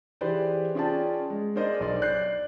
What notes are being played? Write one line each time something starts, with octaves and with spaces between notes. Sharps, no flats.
E3 G4 G#4 B4 C5 D5
C#4 F4 G#4 D5 G5 A5
G#3
D4 G#4 A#4 C5 D5 D#5
B1 D5
D5 F#6 G6 C7